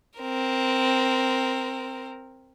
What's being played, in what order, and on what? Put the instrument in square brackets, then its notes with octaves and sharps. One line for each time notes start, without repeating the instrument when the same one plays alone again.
[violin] C4 A#4